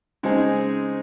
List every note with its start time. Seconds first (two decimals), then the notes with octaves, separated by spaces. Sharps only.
0.23 C#3 G#3 C4 D#4 G#4